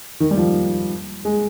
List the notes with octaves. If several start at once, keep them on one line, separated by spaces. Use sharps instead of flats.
D#3
G3
F3
G#3